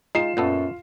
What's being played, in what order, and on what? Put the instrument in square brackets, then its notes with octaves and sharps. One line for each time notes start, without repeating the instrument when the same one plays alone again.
[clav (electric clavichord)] G#3 D#4 [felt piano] F4 C7 E7
[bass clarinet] F#2 [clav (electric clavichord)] A#2 B3 A4